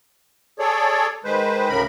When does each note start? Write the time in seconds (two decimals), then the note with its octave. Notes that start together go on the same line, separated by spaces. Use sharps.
0.59 G#4 A4 C#5 D5
1.24 D#3 G#3 B4 C5
1.69 D2 A2 C#3 A#4 B5